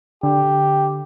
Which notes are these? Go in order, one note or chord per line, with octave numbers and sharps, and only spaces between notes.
D3 G4